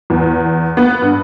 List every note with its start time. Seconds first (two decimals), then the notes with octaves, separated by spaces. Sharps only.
0.10 E2
0.77 B3
1.02 G2